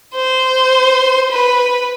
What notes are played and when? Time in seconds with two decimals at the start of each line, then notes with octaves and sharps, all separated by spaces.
0.15 C5
1.31 B4